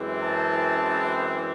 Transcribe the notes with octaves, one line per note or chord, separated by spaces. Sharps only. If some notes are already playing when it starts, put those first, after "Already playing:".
Already playing: F#2 E3 G#3 C4
A5